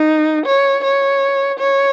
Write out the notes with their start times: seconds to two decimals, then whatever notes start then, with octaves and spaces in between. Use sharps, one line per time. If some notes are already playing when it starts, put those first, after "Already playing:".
Already playing: D#4
0.46 C#5
0.84 C#5
1.59 C#5